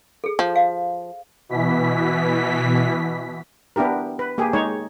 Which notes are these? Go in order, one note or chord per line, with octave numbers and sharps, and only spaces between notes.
G#4 A4
F3
F5
B2 E3 B6
B3 D4 E4 G4 A#4
B4
A#3 G4 G#4
G#3 D#4 C#5